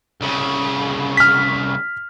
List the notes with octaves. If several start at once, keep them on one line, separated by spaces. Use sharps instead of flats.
C2 C#3
F6 B6